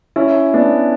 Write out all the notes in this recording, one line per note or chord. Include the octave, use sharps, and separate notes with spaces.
C#4 E4
B3 D4